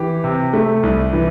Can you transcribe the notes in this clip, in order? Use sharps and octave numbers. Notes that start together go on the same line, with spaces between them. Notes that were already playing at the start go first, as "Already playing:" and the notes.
Already playing: E3 G4
C3
A3
C2
E3